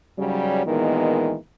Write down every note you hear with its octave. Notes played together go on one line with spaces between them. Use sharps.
G#2 C#3 F#3 G3
A#2 D#3 E3 G#3 B3